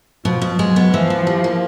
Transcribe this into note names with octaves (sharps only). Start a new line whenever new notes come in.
B2 F3
B2
F#3 G#3
B3
E3 F3
E3
G3
A#3